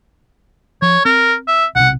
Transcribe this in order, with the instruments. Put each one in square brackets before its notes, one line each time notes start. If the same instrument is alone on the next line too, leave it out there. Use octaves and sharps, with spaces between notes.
[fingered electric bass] F3 [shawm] C#5
[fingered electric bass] C4 [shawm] A#4
[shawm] E5
[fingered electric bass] B1 C3 [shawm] F#5